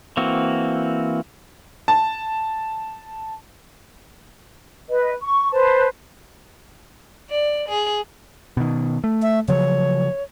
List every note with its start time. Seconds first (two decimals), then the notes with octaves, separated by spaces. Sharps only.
0.17 E3 A#3 C4 F#4
1.88 A5
4.88 B4 D#5
5.21 C#6
5.51 B4 C5 A5
7.29 D5
7.68 G#4
8.57 B2 D#3
9.04 A3
9.22 E5
9.48 C#3 F3 F#3 C#5